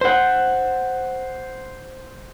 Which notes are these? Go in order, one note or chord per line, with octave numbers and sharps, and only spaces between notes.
C5 F#5